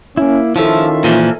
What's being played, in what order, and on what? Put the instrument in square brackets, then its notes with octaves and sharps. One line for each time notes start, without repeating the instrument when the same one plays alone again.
[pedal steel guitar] A#3 E4 [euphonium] C#4
[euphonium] D#3 [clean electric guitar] F3 [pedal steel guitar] C#4 F4 E5 [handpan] E4 A4
[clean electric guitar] A#2 E3 F3